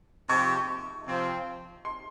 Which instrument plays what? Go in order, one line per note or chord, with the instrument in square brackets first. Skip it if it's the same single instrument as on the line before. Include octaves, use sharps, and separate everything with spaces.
[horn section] C3 F3 C4 G4 [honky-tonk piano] C#6
[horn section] C3 F3 C4
[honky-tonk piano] C6